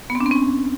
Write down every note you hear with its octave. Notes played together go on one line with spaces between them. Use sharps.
B3
C4
D4
C4
C#4